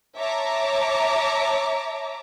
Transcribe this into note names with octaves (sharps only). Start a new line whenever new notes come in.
C#5 E5 A5 A#5 D6